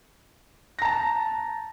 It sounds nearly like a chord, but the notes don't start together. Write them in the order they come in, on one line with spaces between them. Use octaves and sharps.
A#6 A#5 A5